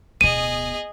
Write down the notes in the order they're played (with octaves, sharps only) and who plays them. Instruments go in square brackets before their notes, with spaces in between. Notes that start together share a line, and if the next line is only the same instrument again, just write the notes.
[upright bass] D1 B2 [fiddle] G#4 D#5 [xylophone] D#7